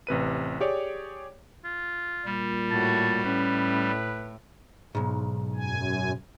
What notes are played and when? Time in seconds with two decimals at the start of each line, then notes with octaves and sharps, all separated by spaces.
0.07 A1 C3 B4 D#7
0.61 G4 G#4 C#5 D5
1.64 F4
2.25 A#2 G3
2.70 A2 F#4 A5
3.25 A2 C#4 B4
4.95 B1 G#2
5.55 F#2 G#5